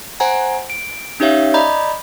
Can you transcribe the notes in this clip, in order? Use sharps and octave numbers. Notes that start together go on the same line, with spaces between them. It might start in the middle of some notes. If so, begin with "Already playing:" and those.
C5 F#5 G#5 A#5
D7
C#4 D#4 G4 C#5 E5 F5
D5 D#5 A#5 B5 G6